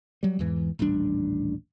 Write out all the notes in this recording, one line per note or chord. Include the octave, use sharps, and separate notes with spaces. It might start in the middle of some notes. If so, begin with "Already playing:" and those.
F#3 G3
E2 G#2 E3
D#1 A1 G3 D4